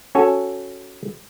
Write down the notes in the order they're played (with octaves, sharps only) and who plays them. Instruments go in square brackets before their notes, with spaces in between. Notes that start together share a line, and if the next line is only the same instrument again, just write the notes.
[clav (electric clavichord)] C#4 F#4 A4 C#5 G#5